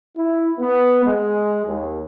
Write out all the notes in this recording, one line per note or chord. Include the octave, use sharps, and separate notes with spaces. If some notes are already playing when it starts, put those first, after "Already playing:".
E4
B3
G#3
D#2